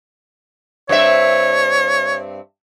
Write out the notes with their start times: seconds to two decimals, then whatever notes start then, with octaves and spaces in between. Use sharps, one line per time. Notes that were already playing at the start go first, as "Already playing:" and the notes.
0.89 G2 C4 C#5 E5